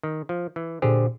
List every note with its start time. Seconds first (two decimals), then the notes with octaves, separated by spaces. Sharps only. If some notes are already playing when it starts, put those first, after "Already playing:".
0.03 D#3
0.29 F3
0.56 E3
0.82 A#2 D3 G4 G#4 C5